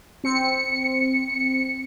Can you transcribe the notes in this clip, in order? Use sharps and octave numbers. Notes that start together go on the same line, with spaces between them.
C4 C#7